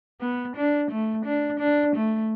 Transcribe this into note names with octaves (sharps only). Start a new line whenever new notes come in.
B3
D4
A3
D4
D4
A3